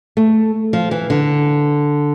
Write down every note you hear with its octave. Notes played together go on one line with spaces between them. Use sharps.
A3
F3
E3
D3